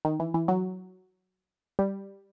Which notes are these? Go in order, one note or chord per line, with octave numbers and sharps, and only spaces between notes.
D#3
E3
E3
F#3
G3